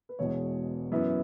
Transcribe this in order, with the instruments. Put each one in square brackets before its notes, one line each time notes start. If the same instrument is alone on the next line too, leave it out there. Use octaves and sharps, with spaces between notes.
[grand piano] B4
E1 E2 B2 G#3 C#5
F#2 E3 B3